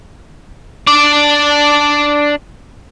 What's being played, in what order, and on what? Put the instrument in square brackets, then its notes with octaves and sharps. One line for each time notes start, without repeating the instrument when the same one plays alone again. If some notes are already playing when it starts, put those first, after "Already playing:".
[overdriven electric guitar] D4 D5